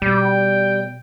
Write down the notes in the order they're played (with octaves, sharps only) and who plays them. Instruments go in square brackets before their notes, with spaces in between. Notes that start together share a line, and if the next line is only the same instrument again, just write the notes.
[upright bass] B2 [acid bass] G3 [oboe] G5